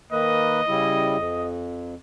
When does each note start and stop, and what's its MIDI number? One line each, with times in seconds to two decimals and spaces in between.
0.12 0.61 51
0.12 0.61 58
0.12 0.61 71
0.12 1.50 75
0.68 1.16 49
0.68 1.16 55
0.68 1.16 64
1.17 1.94 41